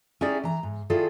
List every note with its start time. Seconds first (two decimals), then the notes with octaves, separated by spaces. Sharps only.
0.21 C#4 D#4 E4 G4 G#4 D5
0.44 E3 A#5
0.63 G#2
0.90 D#3 E4 F4 G#4 A4 D5